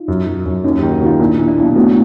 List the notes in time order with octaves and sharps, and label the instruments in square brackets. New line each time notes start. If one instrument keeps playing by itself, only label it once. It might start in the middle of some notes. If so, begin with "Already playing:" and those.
Already playing: [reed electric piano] D#4 F4
[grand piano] F#2
F#3
F#2
[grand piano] D#2 [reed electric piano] C#4 D#4
[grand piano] D#3 [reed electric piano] G4
[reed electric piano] F#4
[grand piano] D#3 [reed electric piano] F4
[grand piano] A#2 [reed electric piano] D4 E4
[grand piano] A#2
[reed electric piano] D4 E4
[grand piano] B1
[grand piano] F#3 [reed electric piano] A3 B3